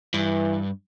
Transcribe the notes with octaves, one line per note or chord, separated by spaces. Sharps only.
G2 E3